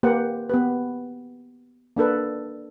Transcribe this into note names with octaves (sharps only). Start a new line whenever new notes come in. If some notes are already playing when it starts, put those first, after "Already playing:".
A#3 G4 B4 C5 F#5
B3 G4 B4
A#3 D4 A4 B4